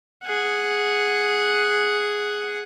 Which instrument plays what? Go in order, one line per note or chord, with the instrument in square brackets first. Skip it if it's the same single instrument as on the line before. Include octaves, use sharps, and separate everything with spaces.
[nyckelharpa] G#4 F#5